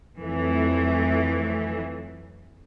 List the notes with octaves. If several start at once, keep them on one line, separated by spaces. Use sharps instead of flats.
F2 E3 F#3 A3